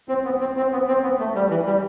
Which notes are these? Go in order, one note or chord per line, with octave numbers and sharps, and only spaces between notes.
C4
B3
C4
C4
B3
C4
B3
A3
G3
E3
G3